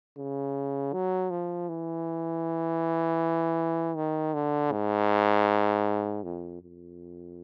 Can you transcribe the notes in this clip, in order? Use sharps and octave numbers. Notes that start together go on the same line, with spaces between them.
C#3
F#3
F3
E3
D#3
D3
G#2
F2
F2